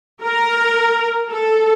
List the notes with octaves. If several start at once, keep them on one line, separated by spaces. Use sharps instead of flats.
A#4
A4